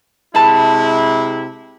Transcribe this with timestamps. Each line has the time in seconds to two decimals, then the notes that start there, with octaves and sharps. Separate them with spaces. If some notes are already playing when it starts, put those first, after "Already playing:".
0.35 C3 G#3 E4 A5 B5